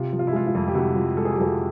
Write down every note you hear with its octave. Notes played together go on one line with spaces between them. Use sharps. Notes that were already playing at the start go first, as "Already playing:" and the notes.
Already playing: C3 F4
F3
F4
E4
G#3 F4
F4
F2
G4
C3 E4 F#4
F3
G#3 A4
G#4
G4
F2 F#4 G#4